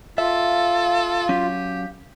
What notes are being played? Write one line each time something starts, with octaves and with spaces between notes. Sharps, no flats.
F4 A4 E5 F5
F#3 C#4 G4